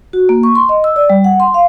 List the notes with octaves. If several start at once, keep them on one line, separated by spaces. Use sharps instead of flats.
F#4
A#3
C#6
C6
D#5
E6
D5
G3
F#5
C6
F5